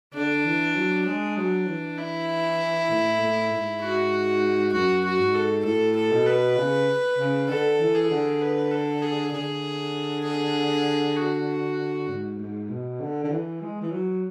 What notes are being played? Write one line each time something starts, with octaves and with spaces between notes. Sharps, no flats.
D3 D4
E3
F#3
G#3 D4
F#3
E3
E4
A2
A2
G#2
F#4
F#2 F#4
F#4
G#2
A4
A2 A4
A4
B2
B4
C#3
C#3
D3 A4
E3
G#4
D3
B4
A4
G#4
D3 G#4
G#4
F#4
G#2
G#2
B2
D3
D3
E3
G#3
E3
F#3